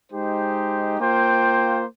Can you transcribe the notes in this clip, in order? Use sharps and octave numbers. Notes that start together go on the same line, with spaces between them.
G#3 D#4 G4 C5
A#3 F4 C5 G5